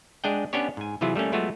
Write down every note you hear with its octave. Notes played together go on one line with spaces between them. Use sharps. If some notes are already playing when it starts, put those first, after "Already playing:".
G#3 D4 G#4 F#5 G5
B3 C#4 D4 G4 C#5
G#2 G#5
C3 E3 F#3 E4 F4 G#4
G3 A3 A#3 C#4
F#3 G#3 A3 B3 F4 F#4